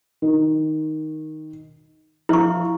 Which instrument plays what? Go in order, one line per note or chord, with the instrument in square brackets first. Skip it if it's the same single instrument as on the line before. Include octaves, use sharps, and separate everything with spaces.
[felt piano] D#3
[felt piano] F3 E5 F6 [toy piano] E4 C#6